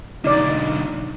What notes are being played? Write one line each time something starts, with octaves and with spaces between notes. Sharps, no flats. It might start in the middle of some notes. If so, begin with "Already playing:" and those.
B1 D3 D#4 D5